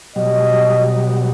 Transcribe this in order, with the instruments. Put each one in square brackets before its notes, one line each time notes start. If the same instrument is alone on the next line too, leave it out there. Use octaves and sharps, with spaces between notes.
[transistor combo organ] B2 F#3 G3 [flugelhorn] D#5